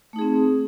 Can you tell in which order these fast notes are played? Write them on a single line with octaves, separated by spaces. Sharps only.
A3 D#4 G#4 C4